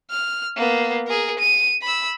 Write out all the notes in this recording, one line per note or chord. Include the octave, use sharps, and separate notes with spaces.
F6
A#3 B3
G#4 A#4
D#7
B5 E6